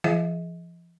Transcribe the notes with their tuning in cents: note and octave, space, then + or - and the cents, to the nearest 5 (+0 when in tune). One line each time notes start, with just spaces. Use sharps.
F3 -40 G#4 +25 D#5 +30